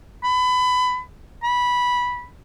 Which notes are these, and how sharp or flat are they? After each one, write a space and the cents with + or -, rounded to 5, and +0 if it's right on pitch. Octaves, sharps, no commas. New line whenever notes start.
B5 +25
B5 -10